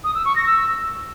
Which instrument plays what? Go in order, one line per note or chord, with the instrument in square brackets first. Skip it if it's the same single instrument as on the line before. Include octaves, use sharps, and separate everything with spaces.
[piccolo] D#6
E6
C#6
A#6
E6